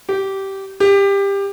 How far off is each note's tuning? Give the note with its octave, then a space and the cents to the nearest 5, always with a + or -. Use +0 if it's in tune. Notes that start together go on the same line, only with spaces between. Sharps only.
G4 -15
G4 +20